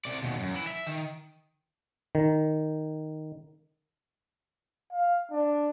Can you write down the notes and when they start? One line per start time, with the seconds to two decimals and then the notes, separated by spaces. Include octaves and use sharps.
0.05 C3 D5
0.23 D#2 B2
0.40 F#2
0.54 E3 E4
0.67 E5
0.87 D#3
2.15 D#3
4.92 F5
5.31 D4